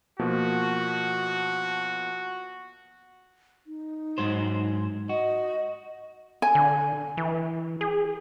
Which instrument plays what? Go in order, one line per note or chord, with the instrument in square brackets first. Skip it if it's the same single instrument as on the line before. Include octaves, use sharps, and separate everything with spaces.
[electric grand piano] B2 F3 A#3 [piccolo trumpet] F#4
[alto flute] D#4
[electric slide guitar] G#2 F#3 C5
[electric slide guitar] F#4 [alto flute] D#5
[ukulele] G#5
[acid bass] D3
E3
G#4